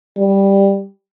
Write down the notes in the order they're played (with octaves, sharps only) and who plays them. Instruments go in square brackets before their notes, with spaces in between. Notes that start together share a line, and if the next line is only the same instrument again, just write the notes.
[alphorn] G3